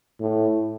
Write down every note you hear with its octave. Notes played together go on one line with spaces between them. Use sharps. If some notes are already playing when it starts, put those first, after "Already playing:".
A2